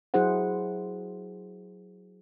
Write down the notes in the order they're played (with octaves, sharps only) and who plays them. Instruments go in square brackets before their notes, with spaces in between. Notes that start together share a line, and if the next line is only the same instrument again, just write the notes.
[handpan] F#3 E4 G#4 C5 F#5